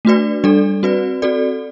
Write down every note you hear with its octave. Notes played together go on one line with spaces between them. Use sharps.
A3 D4 F#4 B4 D5
G3 D4 A4 D5
C4 F#4 B4 D5
C4 F#4 A4 D5